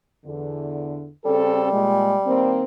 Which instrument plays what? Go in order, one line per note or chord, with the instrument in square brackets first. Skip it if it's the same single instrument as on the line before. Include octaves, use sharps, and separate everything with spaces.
[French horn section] E2 D3
[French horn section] C#3 C4 A4 [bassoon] G3
[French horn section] A#2 G#3
D#3 A#3 C4